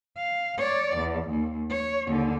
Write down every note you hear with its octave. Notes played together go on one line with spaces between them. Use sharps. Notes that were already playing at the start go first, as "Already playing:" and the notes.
F5
C#5 D5
E2
D#2
C#5
D#2 D3